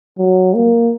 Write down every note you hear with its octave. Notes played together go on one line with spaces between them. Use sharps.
F#3
A#3